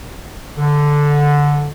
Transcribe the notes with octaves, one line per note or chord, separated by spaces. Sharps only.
D3